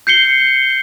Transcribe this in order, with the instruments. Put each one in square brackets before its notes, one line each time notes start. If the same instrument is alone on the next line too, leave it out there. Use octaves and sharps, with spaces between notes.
[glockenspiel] G6 C7 C#7 G7